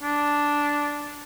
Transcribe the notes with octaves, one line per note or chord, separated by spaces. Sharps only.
D4